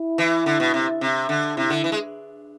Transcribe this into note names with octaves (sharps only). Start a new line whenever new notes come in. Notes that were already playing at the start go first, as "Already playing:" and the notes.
Already playing: E4
E3
D3
B2
C3
C3
D3
C3 E4
D3
E3
G#3